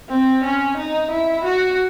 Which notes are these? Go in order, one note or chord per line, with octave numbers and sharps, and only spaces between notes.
C4
C#4
D#4
E4
F#4